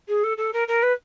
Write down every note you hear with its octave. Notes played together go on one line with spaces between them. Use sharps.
G#4
A4
A4
A#4
A#4
B4